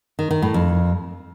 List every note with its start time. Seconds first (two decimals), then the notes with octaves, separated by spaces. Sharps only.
0.19 D#3
0.31 D#3
0.42 A2
0.54 F2